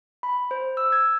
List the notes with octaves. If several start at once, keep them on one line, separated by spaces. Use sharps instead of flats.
B5
C5
E6
G#6